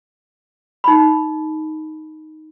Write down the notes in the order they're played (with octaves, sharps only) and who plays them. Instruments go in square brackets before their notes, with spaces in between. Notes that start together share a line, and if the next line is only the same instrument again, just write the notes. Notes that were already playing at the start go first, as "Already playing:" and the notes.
[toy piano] D#4 B5